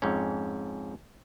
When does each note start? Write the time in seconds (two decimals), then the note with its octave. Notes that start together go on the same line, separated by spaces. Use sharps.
0.02 F2 G#2 C#4